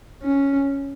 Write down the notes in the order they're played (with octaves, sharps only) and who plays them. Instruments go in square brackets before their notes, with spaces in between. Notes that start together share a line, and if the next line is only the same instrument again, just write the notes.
[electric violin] C#4